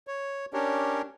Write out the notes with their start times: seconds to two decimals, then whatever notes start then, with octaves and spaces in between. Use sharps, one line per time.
0.07 C#5
0.53 C#4 D4 G4 A#4 C#5